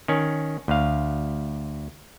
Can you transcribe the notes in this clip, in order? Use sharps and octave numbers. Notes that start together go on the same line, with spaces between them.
D#3 C#4
D2 F5